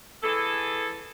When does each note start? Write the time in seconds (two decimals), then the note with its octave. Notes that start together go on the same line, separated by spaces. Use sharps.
0.23 E3 G#4 A4